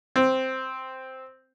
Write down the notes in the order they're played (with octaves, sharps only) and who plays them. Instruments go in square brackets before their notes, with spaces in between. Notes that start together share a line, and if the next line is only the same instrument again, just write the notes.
[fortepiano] C4